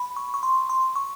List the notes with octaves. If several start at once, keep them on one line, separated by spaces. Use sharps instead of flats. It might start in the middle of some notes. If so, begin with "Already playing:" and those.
Already playing: B5
C#6
C#6
C6
C6
C#6